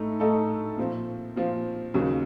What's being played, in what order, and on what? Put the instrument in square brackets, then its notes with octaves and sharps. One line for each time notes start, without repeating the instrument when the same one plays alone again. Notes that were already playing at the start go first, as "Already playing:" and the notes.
Already playing: [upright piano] A2 A3 D#4 A4
A2 A3 D#4 A4
A#2 F3 C4
A#2 F3 C4
D#2 C#3 F#3